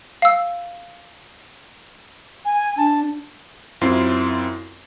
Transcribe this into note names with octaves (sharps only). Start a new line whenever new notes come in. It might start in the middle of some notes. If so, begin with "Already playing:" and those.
F5 E6
G#5
D4 A5
F#2 C4 E4 F4 C6 C7